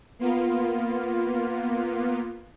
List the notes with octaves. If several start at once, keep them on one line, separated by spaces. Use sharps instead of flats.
A#3 B3 F4